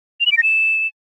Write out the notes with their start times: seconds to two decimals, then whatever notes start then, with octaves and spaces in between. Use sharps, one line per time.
0.20 F7
0.26 F#7
0.32 D7
0.37 A#6
0.43 E7